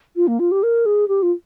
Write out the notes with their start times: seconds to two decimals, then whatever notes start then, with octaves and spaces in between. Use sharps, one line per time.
0.16 F4
0.27 A#3
0.39 F4
0.51 G4
0.63 A#4
0.86 G#4
1.08 G4
1.22 F4